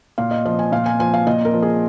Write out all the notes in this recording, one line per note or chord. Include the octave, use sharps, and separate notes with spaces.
A#2 F5
D#5
F3 D#5
G#5
A#2 F5
G#5
F3 G#5
F5
A#2 D#5
A#4
F3
G#4